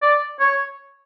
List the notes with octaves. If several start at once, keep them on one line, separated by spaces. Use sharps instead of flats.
D5
C#5